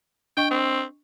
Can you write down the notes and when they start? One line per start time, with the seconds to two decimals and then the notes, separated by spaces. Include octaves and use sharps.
0.37 D4 D#5 G5 C#6
0.51 C4